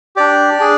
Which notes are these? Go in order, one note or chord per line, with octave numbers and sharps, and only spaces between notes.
D4 G4 D5
D4 G#4